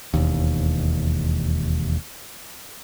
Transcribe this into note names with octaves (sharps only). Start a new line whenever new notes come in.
E1 D#2